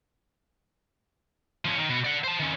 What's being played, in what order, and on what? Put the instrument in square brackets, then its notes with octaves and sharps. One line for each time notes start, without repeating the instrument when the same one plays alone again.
[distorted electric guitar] F3 C#4
D#3
B2 F#4
D5 F#5
C5 A5
D#3 C#4